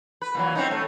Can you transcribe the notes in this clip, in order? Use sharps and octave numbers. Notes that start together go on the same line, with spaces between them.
B4
A#2 E3 F#3
C4 C#4 D#4
A3